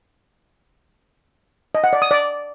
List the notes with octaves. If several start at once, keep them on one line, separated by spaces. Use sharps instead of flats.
D#5
F#5
D5
D#6
D5